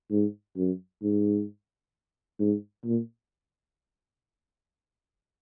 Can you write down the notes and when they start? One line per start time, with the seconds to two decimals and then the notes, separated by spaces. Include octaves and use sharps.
0.11 G#2
0.56 F#2
1.02 G#2
2.40 G#2
2.85 A#2